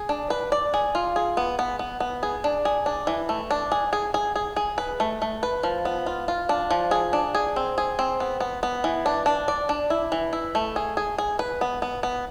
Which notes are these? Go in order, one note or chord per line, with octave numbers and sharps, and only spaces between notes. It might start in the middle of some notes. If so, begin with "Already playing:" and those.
Already playing: G#4
D4
B4
D5
G#4
F4
G#4
B3
B3
B3
B3
G#4
D4
G#4
D4
E3
A3
D4
G#4
G#4
G#4
G#4
G#4
B4
A3
A3
B4
F3
B3
F4
F4
D4
F3
G#4
D4
G#4
C4
G#4
C4
B3
B3
B3
E3
D4
D4
D5
D4
E4
E3
E4
A3
G#4
G#4
G#4
B4
B3
B3
B3